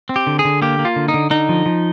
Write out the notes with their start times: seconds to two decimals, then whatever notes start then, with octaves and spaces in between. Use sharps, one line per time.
0.09 C4
0.16 G4
0.27 D3
0.39 G#4
0.45 D3
0.62 A#3 G4
0.79 A#3
0.85 F4
0.96 D3
1.08 D#4
1.14 D3
1.30 D3 D#4
1.49 F3
1.66 F3